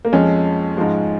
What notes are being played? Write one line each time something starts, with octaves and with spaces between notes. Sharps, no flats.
A#3
F2 F3 G#3 C#4
G#2 F3 G#3